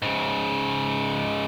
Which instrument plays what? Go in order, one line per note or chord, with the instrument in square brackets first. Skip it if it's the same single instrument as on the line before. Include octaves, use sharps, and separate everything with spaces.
[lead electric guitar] G#2 C#3